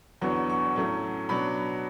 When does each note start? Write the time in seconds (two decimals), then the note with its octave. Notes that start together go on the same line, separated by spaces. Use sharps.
0.21 E2 D3 F#3 B3 C#6
0.50 C#6
0.76 A2 F#3 A3 C#4
1.29 B2 F#3 B3 D4 B5